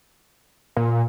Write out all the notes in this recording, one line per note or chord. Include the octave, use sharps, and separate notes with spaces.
A#2